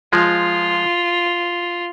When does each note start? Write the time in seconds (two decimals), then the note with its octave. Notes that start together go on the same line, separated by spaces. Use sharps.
0.13 F3 G#3 F4